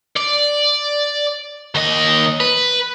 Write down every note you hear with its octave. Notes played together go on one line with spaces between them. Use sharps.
D5
D#2 D#5
B4